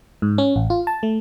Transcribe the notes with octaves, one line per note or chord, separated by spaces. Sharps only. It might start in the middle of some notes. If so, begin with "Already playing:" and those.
G#2
C#4
A1
F4
A5
A3